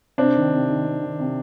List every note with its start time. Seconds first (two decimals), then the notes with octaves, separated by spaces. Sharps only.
0.18 C3 C4 D4
0.35 D#3
0.52 C3
0.69 D#3
0.86 C3
1.03 D#3
1.20 C3